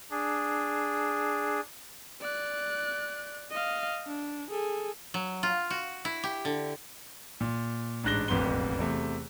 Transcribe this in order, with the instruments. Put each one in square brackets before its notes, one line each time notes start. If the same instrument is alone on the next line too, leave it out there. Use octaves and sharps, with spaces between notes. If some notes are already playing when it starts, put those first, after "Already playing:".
[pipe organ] D4 G#4
[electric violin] D5 F#6
D#5 F5
D4
G#4 A4
[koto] F#3
F4
F#4
E4
G4
D3
[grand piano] A#2
A1 G#2 D4 F#6 A#6 G7
E1 A1 F2 B3 C6 G7
E2 C3 A3